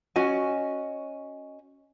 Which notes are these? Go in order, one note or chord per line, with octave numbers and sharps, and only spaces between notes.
C#4 F#4 D#5 G#5